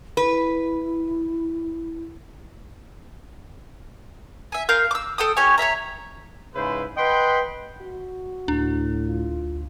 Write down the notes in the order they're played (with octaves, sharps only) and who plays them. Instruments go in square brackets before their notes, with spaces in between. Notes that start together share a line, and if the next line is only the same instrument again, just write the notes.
[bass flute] E4 [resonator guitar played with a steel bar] B4
[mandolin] E5 G#5
A#4 F5 C6 G6
D6 E6
A4 G5 D#6
C#4 G4 C#5 G#5
C#5 D#5 E5 A#5
[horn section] G#2 C#3 E4 B4 C5
B4 D#5 F#5 G5 B5 C6
[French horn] F#4
[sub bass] D2 [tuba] A2 [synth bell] D4
[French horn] F4